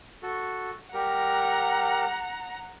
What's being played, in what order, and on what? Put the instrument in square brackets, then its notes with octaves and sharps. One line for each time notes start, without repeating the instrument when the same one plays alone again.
[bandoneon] F#4 A4
[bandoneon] G3 G4 A#4 [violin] F#5 A#5